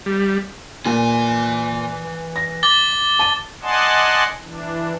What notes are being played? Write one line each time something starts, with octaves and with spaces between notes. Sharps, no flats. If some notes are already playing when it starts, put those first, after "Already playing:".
G3
A#2 E3 G#5
A#6
D6 A6 G7
A5 D#7
D5 D#5 F#5 G#5 A5 C6
E3 D4